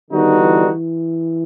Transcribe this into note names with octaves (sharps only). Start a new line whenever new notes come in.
D3 D#3 G3 B3 D#4 F#4
E3
E3